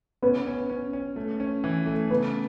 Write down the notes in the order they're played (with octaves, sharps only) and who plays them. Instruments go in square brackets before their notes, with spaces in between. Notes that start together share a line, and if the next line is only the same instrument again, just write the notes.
[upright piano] B3 [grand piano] C#4
[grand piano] C#4
C#4
C#4
A3
C#4
E3
A3
[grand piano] C#3 [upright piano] B3